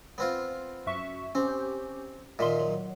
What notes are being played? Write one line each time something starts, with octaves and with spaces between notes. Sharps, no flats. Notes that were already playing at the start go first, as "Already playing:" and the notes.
B3 C4 F4
F#2 E5 C#6
C4 C#4 G4
A#2 D#3 E5 C6
F#3